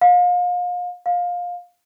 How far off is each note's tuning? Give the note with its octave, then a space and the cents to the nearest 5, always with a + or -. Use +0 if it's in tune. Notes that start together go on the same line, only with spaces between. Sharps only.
F5 +35
F5 +20